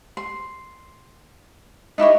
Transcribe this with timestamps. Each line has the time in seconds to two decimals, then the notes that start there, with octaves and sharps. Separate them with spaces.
0.17 C6
1.98 D#4 E4 G4 C#5